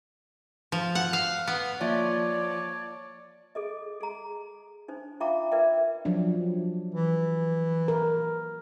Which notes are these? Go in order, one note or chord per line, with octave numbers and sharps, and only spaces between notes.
F3
F#5
F5
B3
F3 A#3 C#5 D5 E5
G#4 A4 D#5
G#4 A#5
D4 D#4 C5
F4 E5 F5 G5 A#5 D6
A#4 B4 D5 E5 G5
F3 F#3 D4
E3
A#4